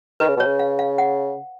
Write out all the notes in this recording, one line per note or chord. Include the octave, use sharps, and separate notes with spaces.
D#3 B4
C#3
B2 C#5
C#3
F5
F5
F#5